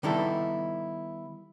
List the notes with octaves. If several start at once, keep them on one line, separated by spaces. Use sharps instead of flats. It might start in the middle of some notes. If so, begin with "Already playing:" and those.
D#3 G3 B3 D#4 E4 A4